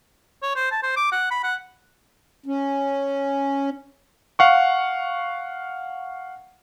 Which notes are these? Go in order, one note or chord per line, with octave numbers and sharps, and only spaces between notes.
C#5
C5
A5
C5
D6
F#5
B5
F#5
C#4
F5 F#5 C#6